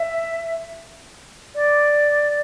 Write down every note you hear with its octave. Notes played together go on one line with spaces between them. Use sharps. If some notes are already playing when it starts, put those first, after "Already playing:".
Already playing: E5
D5